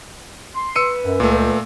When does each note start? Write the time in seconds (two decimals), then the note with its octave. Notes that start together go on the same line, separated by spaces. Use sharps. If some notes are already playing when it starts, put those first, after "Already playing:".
0.55 C6
0.76 B4 E6 C#7 D#7
1.02 F#2
1.20 C#2 A#2 A3